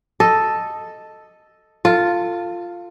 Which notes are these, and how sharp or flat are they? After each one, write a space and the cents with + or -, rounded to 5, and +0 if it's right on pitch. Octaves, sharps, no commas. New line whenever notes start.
A4 +0 D#5 +0
F4 +0 A4 +25